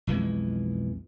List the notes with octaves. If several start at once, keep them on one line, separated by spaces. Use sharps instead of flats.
B1 F2 E3 G#3